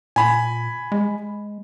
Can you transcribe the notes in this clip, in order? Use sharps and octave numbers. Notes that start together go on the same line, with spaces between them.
A#2 G#5 B5
G#3